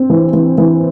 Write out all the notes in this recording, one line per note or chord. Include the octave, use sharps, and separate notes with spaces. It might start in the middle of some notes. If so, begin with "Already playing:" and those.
Already playing: C4
E3
E3
E3